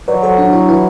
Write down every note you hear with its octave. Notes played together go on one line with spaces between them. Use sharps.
F#3 B4 D5
F#3 A4 C5
F#3 D4
F#3 E4
E3 E4